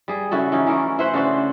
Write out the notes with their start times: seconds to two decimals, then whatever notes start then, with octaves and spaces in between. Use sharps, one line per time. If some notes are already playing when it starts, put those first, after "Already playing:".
0.08 G3 G#4
0.31 C#3 E4 F#4 A4
0.52 E3 C#4 D#4
0.67 E3 A3 A#4
0.99 E4 B4 C5 F#5
1.14 C#3 D4 F#4 C5